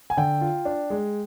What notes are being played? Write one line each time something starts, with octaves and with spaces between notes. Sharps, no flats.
G#5
D3 G5
F4
D4
G#3